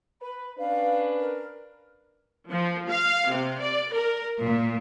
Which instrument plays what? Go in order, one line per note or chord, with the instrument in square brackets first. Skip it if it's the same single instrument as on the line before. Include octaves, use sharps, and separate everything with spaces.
[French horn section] B4 [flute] B5
[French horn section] C#4 D4 B4 [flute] F5
[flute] A#4
[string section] F3
F5
C3
D5
A#4
A#2